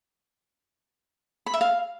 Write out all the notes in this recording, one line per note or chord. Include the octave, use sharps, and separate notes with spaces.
B5
E5
F5